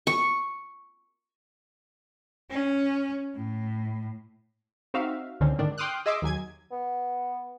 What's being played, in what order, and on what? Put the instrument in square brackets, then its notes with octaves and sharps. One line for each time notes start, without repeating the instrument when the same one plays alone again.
[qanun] C#6
[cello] C#4
A2
[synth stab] C4 D#4 F#4 E5 F5
C#2 D3 D#3 C4 C#4
G#2 D3 D#3 D4
G5 C6 D6 D#6 F6 F#6
G#4 D#5 E5 C6 D6
D#2 F#3 G#5 G#6
[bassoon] B3